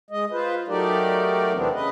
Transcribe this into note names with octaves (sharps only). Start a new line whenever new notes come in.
G#3 D#5
F4 B4 C5
F#3 A3 D#4 G4 A#4 D5
E2 C3 E3 B3 C4 D4
C#3 B4 D#5